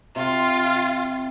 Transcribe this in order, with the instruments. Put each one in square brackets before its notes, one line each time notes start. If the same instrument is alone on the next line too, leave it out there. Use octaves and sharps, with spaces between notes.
[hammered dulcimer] C3 [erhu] F4